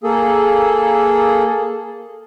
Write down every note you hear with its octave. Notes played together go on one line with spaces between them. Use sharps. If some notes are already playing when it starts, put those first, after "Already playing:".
A#3 G#4 A4